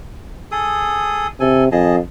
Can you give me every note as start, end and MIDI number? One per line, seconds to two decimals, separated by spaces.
0.51 1.27 68
0.51 1.27 69
0.51 1.27 87
1.40 1.71 48
1.40 1.64 69
1.40 1.64 80
1.72 1.99 41
1.72 1.96 68
1.72 1.96 75
1.72 1.96 81